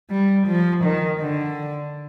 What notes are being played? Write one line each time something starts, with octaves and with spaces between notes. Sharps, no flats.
G3
F3
D#3
D3